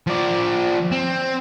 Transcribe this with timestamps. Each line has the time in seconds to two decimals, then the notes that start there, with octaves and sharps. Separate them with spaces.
0.07 F3 D5
0.92 C4